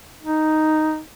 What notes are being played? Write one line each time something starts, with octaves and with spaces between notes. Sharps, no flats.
D#4